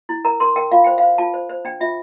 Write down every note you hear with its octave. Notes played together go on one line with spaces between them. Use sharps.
E4
A#4 A#5
A#4 C6
A#4 G5
F4 F5
C5 G5
C5 F5
F4 A5
C5
C5
D4 G5
F4 E5